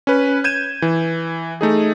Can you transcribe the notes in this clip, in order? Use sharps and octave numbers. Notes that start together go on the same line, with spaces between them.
C#4 B4
G6 G#6 D#7 E7
E3
A3 D#4 G#4